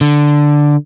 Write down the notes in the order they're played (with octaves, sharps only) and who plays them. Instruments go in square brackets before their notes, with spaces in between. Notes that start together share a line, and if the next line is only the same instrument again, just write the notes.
[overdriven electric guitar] D3